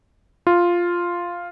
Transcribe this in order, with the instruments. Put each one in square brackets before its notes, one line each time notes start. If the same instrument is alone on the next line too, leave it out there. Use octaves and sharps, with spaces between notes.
[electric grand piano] F4